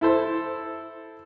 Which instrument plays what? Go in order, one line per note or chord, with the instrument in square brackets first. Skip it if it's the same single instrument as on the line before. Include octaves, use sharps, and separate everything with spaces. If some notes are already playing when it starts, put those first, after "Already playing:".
[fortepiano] E4 A4 C5